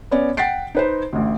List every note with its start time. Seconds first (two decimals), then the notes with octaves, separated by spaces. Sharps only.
0.11 B3 C#4 C#5 D5
0.37 F#5 G5 A6 B6 C7 D7
0.75 D#4 B4 C5
1.13 A1 D2